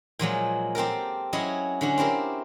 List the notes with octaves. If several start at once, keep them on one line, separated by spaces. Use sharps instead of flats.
A#2 F3 F#3 G#3
C4 G4 A4 A#4
F#3 C#4 E4 G#4 D#5
D3 C#4 F#4
C4 E4 G4 A#4